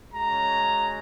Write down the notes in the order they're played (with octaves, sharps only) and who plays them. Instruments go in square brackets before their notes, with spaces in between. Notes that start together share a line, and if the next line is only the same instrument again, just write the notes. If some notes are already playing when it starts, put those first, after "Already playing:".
[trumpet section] G#3 C#4 F#4 A#5